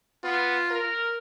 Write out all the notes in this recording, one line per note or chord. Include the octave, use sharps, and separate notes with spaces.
B3 F4
A#4